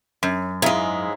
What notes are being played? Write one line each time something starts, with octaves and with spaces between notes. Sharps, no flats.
F#2
G#2 G#3 E4 E5 F5